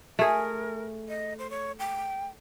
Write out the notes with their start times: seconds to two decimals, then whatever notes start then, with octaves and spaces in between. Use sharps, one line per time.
0.19 A3 G#4 A#4
1.09 D#5
1.39 C5
1.50 C#5
1.79 G5